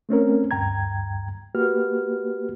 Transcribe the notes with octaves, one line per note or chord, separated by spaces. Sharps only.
A3 C4 C#4 A#4
D2 G2 G5 A#5 G#6
A#3 F#4 G4 B4 F6